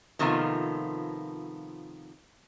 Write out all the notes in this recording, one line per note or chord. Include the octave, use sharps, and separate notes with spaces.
C3 D#3 F3 A3 B3 F4